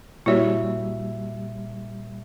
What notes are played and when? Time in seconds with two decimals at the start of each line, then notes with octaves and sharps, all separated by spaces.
0.26 A#2 G3 E4 F#4 C#5 E5